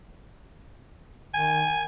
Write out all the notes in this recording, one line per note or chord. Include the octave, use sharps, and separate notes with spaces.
D#3 G#5